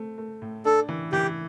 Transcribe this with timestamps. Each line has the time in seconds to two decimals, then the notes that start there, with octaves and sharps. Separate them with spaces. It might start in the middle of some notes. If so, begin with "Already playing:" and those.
Already playing: A3 C4
0.18 A3
0.42 A2
0.65 D4 A4
0.89 E3
1.13 E3 G4